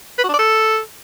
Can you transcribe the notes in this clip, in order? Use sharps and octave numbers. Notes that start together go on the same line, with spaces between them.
B4
F#4
D4
D5
A4